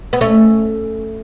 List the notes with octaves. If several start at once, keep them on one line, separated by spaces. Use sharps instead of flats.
B3
A3 C#4